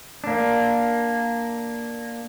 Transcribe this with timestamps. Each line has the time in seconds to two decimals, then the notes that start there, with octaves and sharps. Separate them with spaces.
0.24 A#3 D4